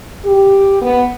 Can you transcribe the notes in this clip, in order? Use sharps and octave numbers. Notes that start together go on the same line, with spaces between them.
G4
B3